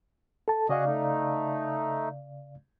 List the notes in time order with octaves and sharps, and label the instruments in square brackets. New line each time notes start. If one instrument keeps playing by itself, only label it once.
[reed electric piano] A4 A5
[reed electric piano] C#3 D5 F5 [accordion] F#4 G#4 D#5
[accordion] A3 D#4